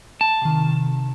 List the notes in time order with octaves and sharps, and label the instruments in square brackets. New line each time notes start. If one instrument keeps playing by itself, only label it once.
[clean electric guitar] A5
[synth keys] C3 D#3